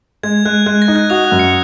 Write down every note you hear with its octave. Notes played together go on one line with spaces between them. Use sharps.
G#3 G#6
G#3 F#6
G#3 F#6
A#6
D#4
F#6
F#4 D#6
F#6
F#2
C#7